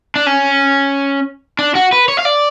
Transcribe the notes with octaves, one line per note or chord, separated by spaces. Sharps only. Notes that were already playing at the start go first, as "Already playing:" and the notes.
D4
C#4
D4
F#4
B4
C#5
F5
D5